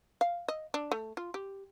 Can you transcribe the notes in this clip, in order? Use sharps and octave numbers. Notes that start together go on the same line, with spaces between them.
F5
D#5
D4
A3
F4
G4